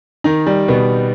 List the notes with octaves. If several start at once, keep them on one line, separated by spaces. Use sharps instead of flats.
D#3 D#4
G3
B2 B3